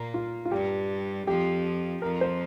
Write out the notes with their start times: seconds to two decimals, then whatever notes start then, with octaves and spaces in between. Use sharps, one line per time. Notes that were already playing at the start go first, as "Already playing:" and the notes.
Already playing: A#2 A#3
0.14 F4
0.45 F4
0.51 G2 G3 G4
1.27 F2 F3 G4
2.02 F2 F3 A#4
2.21 C5